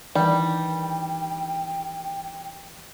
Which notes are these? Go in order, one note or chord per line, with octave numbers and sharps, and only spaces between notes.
D#3 E3 G3 D4 G5